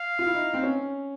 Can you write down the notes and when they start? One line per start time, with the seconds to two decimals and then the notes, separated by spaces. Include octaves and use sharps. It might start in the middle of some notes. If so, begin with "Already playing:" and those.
Already playing: F5
0.19 F4
0.27 E4
0.35 D#4
0.54 C4
0.63 C#4